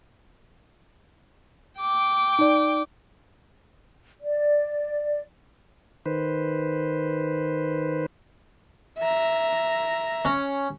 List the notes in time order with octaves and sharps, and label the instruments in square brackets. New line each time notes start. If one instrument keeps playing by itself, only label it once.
[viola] G5 D6
[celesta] D#4 D5
[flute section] D5
[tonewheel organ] D#3 B4 C5
[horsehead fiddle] E5 A#5
[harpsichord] C#4